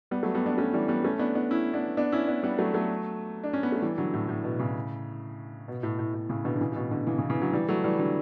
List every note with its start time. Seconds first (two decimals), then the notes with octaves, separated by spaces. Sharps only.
0.11 G3 B3
0.23 F#3 A3
0.34 G3 B3
0.46 B3 D4
0.58 A3 C#4
0.73 E3 G3
0.88 G3 B3
1.04 A3 C#4
1.19 B3 D4
1.35 B3 D4
1.50 C#4 E4
1.74 B3 D4
1.97 B3 D4
2.12 C#4 E4
2.27 B3 D4
2.43 G3 B3
2.59 F#3 A3
2.74 F#3 A3
3.44 D4
3.53 C#4
3.63 B3
3.72 A3
3.82 E3 G3
3.98 D3 F#3
4.14 A2
4.29 A2
4.44 B2
4.60 A2 C#3
5.68 B2
5.83 A2
5.99 A2
6.14 A2
6.29 A2 C#3
6.45 B2 D3
6.56 D3
6.61 C#3 E3
6.72 A2
6.76 B2
6.91 B2 D3
7.07 C#3 E3
7.18 C#3 E3
7.30 C#3 E3
7.42 D3 F#3
7.53 E3 G3
7.68 F#3 A3
7.84 E3 G3
7.99 D3 F#3